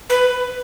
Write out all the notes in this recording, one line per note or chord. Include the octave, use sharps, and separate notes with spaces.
B4